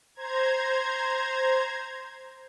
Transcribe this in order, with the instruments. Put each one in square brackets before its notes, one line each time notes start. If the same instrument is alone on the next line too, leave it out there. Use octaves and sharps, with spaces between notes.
[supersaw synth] C5 A#5 G#6